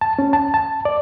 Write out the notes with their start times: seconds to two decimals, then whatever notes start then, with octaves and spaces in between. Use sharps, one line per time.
0.01 A5
0.19 C#4
0.33 A5
0.54 A5
0.85 D5